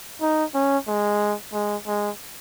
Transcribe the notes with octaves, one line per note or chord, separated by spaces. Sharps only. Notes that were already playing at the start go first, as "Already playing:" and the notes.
D#4
C#4
G#3
G#3
G#3